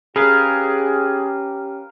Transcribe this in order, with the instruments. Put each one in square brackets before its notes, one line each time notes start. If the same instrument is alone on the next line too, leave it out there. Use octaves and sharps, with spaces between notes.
[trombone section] C#4 G4 [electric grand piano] G#4 [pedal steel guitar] A#4 B4 F5